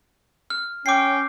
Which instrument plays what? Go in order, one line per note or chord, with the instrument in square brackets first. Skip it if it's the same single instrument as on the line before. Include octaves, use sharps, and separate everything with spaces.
[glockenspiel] F6
[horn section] C#4 G5 [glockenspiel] D6 C7